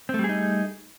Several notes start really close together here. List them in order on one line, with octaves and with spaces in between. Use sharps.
C4 A3 G3 G#4 D#4